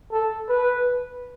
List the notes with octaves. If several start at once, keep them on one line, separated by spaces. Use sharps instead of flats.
A4
B4